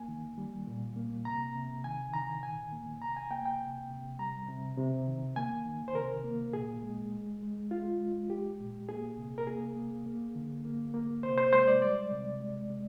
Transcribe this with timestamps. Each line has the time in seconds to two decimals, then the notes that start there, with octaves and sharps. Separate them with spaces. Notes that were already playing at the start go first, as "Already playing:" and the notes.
Already playing: A#3 G#5
0.08 D#3
0.38 G3
0.67 A#2
0.96 A#3
1.25 C3 A#5
1.55 C3
1.84 D#3 G#5
2.13 D#3 A#5
2.43 A#2 G#5
2.72 A#3
3.02 C3 A#5
3.17 G#5
3.31 A#3 G5
3.46 G5
3.60 C3
3.90 C3
4.19 G3 A#5
4.48 C3
4.78 C3
5.07 D#3
5.36 A#3 G#5
5.66 D#3
5.88 C5
5.95 C3 A#4
6.24 A#3
6.53 A#2 G#4
6.83 G#3
7.12 G#3
7.42 G#3
7.71 G#3 F4
8.01 G#3
8.30 G#3 G4
8.60 A#2
8.89 A#3 G#4
9.18 C3
9.38 A#4
9.47 A#3 G#4
9.76 A#3
10.06 A#3
10.35 D3
10.64 A#3
10.94 A#3
11.23 C3 C5
11.38 C5
11.53 G#3 C5
11.68 D5
11.82 G3 D5
12.11 C3
12.40 G#3
12.70 G#3